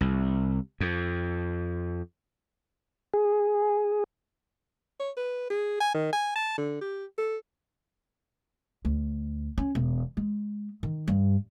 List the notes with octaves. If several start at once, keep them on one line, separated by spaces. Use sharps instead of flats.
C2
F2
G#4
C#5
B4
G#4
G#5
D#3
G#5
A5
D3
G4
A4
D2
C#4
E1
G#3
D#3
G2